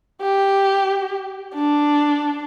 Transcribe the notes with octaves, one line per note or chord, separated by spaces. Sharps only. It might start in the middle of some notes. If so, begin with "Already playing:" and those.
G4
D4